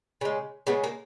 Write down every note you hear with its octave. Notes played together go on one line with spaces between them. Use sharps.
C#3 G#3
C#3 G#3 B3
A#3